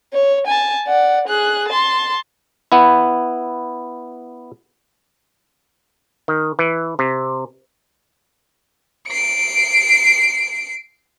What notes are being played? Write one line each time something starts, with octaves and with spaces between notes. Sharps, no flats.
C#5
G#5 A5
D5 F#5
G#4 F#6
A5 C6
B3 E4
D#3
E3
C3
C7 D7